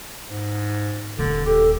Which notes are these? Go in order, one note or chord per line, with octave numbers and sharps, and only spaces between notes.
G#2
D#1 D3
G4 A4